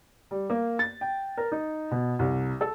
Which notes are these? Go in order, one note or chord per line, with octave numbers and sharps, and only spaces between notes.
G3
A#3
A6
G5
A#4
D#4
B2
C2
A4